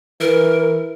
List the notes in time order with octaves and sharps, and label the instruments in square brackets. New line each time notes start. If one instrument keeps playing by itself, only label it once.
[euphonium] E3 [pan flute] A#4